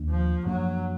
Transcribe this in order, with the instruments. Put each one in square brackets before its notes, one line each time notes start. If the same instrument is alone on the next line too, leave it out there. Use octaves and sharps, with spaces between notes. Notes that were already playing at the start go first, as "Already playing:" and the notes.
Already playing: [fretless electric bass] D#2 D#3 A#3 D4
[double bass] F3
[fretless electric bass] F#2 F3 A#3 D4 [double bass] F#3